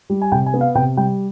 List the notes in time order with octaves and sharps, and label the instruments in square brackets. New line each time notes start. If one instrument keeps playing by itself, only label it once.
[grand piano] G3
G#5
C3 G5
G#5
B3
F5
C3 G5
G3 G5